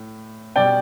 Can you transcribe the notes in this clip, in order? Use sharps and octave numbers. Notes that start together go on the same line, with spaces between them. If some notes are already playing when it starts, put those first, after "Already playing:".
Already playing: A2
B2 G3 D5 G5